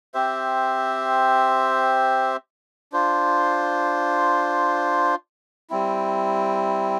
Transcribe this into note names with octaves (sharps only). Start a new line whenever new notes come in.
C4 G4 C5 E5
D4 F4 C5
G3 C4 E4